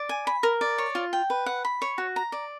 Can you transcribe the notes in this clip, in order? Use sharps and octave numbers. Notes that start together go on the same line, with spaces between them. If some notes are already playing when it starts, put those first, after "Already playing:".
Already playing: D5
G#5
B5
A#4
D5
C#5
F4
G5
B4
F#5
B5
C#5
F#4
A#5
D5